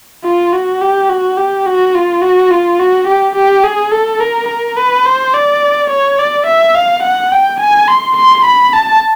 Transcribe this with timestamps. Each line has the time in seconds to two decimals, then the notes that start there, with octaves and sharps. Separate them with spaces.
0.24 F4
0.53 F#4
0.82 G4
1.09 F#4
1.38 G4
1.66 F#4
1.95 F4
2.22 F#4
2.51 F4
2.79 F#4
3.08 G4
3.36 G4
3.64 G#4
3.92 A4
4.20 A#4
4.49 A#4
4.77 B4
5.06 C5
5.34 D5
5.90 C#5
6.19 D5
6.47 E5
6.75 F5
7.03 F#5
7.32 G5
7.60 G#5
7.88 C6
8.17 C6
8.45 B5
8.73 A5